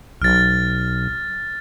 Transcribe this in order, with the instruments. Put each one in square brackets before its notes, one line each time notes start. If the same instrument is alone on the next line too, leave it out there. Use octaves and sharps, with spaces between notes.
[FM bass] B1 [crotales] F6 A6